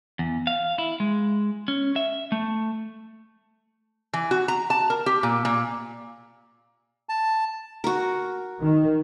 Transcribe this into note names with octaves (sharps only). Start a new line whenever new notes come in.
E2
F5
E4
G#3
C#4
E5
A3
E3
F#4
A#5
A5
A#4
G4
A#2
A#2
A5
F#4 A#4
D#3